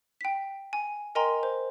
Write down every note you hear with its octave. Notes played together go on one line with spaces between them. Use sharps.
G5 B6
G#5
A#4 D#5 G5 G#5 A#5 C6
C5